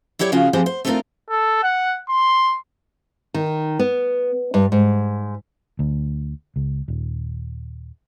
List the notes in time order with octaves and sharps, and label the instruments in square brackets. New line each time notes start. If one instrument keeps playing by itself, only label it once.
[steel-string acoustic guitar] F#3 E4 G4 C#5 D5
C#3 F3 C#4 F4 F#4
F3 G#3 C4 E4 G4 C5
C5
A3 C4 D4 D#4 F4 A#4
[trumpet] A4
F#5
C6
[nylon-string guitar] D#3
B3
G2
G#2
[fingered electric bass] D2
C#2
D#1